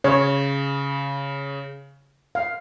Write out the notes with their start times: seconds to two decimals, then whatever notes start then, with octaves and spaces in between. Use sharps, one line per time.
0.04 C#3 C#5
2.35 F5